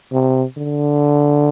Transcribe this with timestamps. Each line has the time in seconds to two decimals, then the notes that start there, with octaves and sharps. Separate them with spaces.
0.12 C3
0.57 D3